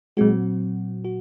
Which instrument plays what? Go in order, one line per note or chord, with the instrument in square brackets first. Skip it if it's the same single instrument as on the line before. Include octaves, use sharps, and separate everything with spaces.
[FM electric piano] A#2 F#3 C4 F#4 [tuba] G#3
[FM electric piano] F#4